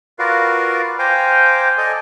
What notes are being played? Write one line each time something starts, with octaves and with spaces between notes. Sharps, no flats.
F4 F#4 A#4 B4 D5 F5
C5 F5 G5 G#5 A#5 D6
A4 D5 D#5 G#5